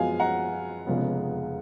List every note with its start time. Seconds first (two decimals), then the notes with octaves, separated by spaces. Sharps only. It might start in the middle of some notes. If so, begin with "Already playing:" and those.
Already playing: F#2 F3 G#3 B3 F5 G#5
0.20 F#5 A#5
0.87 F1 F2 C#3 G#3 B3